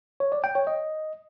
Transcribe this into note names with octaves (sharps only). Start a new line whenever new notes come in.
C#5
D5
G5
C#5
D#5